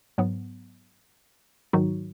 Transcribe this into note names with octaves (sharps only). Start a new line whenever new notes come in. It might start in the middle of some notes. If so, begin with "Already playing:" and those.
G#2 F#3 B3
G#2 D#3 F#3 D#4 F#4